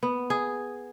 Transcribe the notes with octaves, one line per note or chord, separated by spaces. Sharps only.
B3
G#4